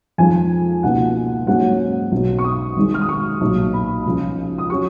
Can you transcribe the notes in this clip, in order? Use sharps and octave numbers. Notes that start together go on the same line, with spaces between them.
F2 F3 G#3 D#4 G#5
C#2 B2 A#3 D#4 F#5
G#2 F#3 A#3 C#4 F#5
B1 B2 F#3
C#6
D#6
G#1 G#2 D#3 G#3
F6
D#6
C#6
B1 A#2 F#3
B5
C#2 C#3 F3
D#6
F#3 C#4 C#6